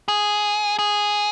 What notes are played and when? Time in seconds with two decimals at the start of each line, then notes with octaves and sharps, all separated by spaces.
0.08 G#4
0.79 G#4